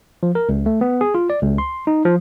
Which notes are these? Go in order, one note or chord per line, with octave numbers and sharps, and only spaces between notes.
F3
A#4
C#2
A3
B3
G#4
F4
D5
C#2
C6
D#4
F3